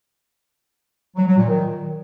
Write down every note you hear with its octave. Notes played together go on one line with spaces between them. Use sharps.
F#3
F#3
A#2
D#3